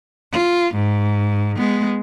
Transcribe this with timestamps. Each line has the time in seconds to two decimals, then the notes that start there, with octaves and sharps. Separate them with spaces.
0.32 F4
0.75 G#2
1.57 G#3 B3